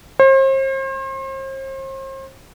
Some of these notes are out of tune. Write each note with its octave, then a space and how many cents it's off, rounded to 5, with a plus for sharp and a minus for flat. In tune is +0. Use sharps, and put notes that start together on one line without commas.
C5 +40